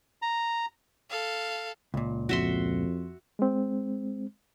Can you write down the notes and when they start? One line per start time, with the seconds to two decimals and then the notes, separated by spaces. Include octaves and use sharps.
0.22 A#5
1.11 A4 F5
1.94 C#2 A#2
2.29 F2 F#4 E5 C6
3.39 G#3 C4